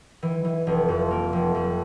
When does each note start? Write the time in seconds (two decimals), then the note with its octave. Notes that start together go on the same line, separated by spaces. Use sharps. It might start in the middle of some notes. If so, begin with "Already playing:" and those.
0.23 E3
0.45 E3
0.67 F1
0.88 F2
1.11 A#3
1.33 F1
1.55 F2